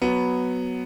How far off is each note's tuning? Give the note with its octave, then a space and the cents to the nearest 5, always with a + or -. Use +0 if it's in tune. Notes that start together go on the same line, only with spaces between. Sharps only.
F#3 +0 B3 +0